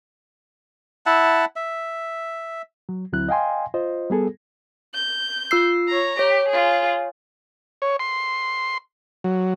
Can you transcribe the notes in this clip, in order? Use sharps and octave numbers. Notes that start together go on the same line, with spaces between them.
E4 E5 F#5 A5
E5
F#3
D2 F#3 C4 E4 F#6
D#5 F5 G5 G#5 C6
F4 C5 D#5
G3 B3 G#4 A4
G6
F4 E6 C7
C#5 A#5
G4 C#5
F4 G#4
C#5
C6
F#3